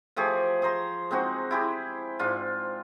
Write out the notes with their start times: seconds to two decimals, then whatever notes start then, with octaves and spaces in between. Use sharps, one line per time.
0.16 F3 A3 G4 G#4
0.62 G#4 C5 A#5 C6
1.11 G#3 C4 D#4 F#4
1.51 E4 G4 G#4
2.19 G#2 D4 F4